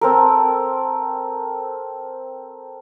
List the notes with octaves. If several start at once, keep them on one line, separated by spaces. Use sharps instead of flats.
C4 A4 A#4